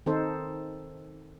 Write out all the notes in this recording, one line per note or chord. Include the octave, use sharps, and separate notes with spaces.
D#3 C4 D#4 A4 C5